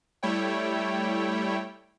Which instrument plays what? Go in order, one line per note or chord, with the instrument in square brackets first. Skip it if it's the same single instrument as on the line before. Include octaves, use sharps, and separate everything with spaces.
[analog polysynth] G3 A3 E4 C#5 G5